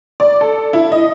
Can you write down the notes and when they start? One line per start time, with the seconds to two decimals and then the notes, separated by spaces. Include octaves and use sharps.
0.20 D5
0.41 A4
0.73 E4
0.92 D#5